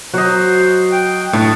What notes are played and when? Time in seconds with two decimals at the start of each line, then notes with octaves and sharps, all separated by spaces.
0.13 F#3 F#4 C5 D#5
0.92 G5
1.33 A2 A3 D4